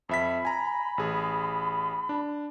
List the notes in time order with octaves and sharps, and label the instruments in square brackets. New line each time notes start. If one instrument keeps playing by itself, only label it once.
[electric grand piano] F2 E5 B6 [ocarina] B5
[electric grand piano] G#5 A#5
A1 G#4
D4